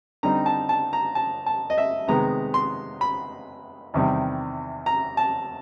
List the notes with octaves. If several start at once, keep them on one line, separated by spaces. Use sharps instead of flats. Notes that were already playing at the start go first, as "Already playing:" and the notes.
D3 G3 C4 D#4 A#5
A5
A5
A#5
A5
A5
D#5
E5
C3 D#3 G#3 B3 A#5
C6
B5
E2 C3 D#3 G3
A#5
A5